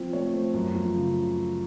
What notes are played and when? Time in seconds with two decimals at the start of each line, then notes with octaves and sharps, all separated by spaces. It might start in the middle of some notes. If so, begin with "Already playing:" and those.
Already playing: F3 C4
0.13 A3 C#5
0.33 A3 C5
0.54 F#2
0.74 F3
0.95 C#3